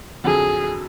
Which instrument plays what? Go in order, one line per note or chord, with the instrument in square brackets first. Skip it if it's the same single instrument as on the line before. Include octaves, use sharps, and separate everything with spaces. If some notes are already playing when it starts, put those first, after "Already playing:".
[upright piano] F2 D3 F#3 [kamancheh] G#4